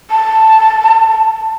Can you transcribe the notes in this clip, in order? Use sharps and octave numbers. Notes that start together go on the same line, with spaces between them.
A5